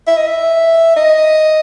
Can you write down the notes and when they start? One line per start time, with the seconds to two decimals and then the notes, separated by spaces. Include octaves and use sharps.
0.07 E5
0.17 D#5
0.27 E5
0.96 D#5